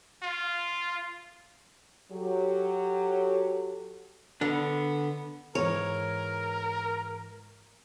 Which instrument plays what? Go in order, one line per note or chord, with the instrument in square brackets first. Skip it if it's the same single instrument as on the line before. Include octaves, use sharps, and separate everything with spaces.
[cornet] F4
[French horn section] F#3 G4 A4
[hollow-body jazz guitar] D3 D4 [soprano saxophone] B3
[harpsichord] G#2 E3 [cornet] A#4 [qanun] C#5